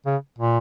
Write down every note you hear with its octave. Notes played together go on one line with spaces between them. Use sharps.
C#3
A#2